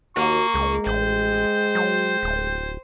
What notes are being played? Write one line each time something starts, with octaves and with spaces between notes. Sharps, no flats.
D#2 A#3 F#4 C#6
C#2 G#3
A1 C5 G5
F#3
D1